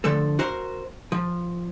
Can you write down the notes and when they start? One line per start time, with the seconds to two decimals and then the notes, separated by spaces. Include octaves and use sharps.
0.04 D3 F3 A3 A4
0.39 F#4 A#4 C5
1.12 F3